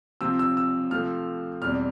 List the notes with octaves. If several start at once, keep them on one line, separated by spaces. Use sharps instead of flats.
C3 F3 C4 E6
E6
E6
C3 F3 A3 C4 F6
E2 B2 G3 C4 F6